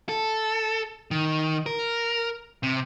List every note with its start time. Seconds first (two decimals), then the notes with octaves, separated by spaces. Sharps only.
0.09 A4
1.11 D#3
1.66 A#4
2.63 C3